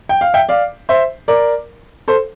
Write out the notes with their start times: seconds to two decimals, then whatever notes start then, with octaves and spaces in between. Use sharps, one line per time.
0.09 G5
0.21 F5
0.34 E5 G5
0.49 D5 F5
0.89 C5 E5
1.28 A#4 D5
2.08 A4 C5